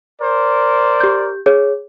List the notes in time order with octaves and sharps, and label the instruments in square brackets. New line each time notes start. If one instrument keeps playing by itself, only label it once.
[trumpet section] A#4 C5 D5
[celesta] G4 G6
G#4 C#5